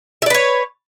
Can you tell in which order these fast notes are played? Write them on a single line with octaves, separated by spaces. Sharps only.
E5 D5 B4 C#5